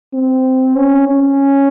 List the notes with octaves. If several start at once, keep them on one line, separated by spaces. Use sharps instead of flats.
C4
C#4
C#4